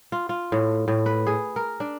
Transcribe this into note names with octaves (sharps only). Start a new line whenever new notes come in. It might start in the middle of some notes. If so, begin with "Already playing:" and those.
F4
F4
A2
A2
B4
G#4
A#4
D4